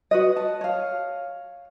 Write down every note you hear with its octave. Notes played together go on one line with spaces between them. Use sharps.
F#4 B4 D#5
A5
C#5 F5